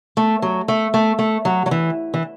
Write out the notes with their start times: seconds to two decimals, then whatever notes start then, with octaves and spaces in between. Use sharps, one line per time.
0.17 A3
0.42 F#3
0.68 A3
0.94 A3
1.19 A3
1.45 F#3
1.66 F#3
1.71 E3
2.14 E3